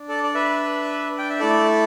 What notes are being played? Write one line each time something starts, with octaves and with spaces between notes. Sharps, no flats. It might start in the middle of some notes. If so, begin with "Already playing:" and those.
Already playing: D4
A4 D5
D5
B4 E5
G5
E5
A3 E4 A4 D5